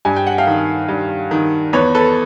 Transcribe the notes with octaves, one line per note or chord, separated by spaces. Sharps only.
G2 G#5
G5
F#5
F5 G5
D#3
G2
D#3
E2 B4 C#5
A4 B4